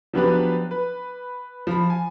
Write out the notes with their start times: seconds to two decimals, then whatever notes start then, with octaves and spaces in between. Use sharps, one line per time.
0.13 F3 F#3 B3 D4 G4 B4
0.71 B4
1.67 F3 B5
1.90 G#5